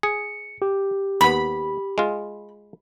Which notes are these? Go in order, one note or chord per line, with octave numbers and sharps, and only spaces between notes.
G#4 C#7
G4
D#2 B3 B5
G#3 F4